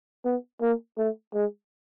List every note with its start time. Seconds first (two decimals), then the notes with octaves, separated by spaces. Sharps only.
0.25 B3
0.61 A#3
0.97 A3
1.34 G#3